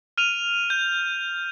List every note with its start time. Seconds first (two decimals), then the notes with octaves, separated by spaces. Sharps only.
0.18 F6 D#7 F7
0.70 G6